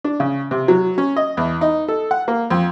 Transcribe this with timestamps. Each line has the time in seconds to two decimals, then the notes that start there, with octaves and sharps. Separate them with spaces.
0.04 D4
0.20 C#3
0.51 C3
0.68 F#3
0.98 C#4
1.16 D#5
1.37 E2
1.61 D#4
1.88 A4
2.11 F#5
2.28 A#3
2.50 F2